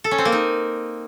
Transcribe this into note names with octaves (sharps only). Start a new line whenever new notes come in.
A4
C#4
C4
A#3
D#4